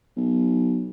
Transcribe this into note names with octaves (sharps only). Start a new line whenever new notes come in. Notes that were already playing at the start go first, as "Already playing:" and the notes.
B1